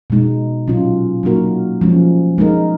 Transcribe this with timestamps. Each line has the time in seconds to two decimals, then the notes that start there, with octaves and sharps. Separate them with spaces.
0.10 B2 G#3 D#4
0.67 A#2 F#3 C#4 F4
1.23 F#3 A#3 D#4 F#4 A#4
1.81 F3 G#3 C#4
2.38 G#3 D#4 A#4